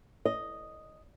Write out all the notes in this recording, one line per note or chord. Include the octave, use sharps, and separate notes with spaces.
D#5